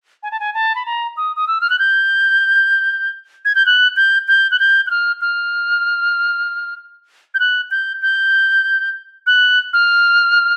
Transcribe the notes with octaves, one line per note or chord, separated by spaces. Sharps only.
G#5
A5
G#5
A5
B5
A#5
D#6
D#6
E6
F6
F#6
G6
G#6
G6
F#6
G6
G6
F#6
G6
F#6
F6
F6
G6
F#6
G6
G6
F#6
F6